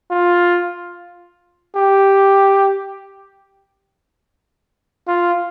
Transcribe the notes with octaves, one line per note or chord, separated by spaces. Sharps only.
F4
G4
F4